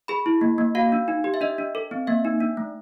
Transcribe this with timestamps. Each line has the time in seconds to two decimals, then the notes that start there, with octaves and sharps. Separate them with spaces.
0.08 G#4 B5
0.26 E4
0.41 A#3
0.58 A#3
0.75 F#4 F5
0.92 D4
1.08 D#4
1.24 G4
1.34 E5
1.41 D4 D#5
1.58 D4
1.75 A4
1.91 C4
2.07 A#3 E5
2.25 D#4
2.41 D4
2.57 A3